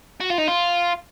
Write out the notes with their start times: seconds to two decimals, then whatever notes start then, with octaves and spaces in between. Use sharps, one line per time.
0.21 F#4
0.30 F4
0.38 D#4
0.48 F4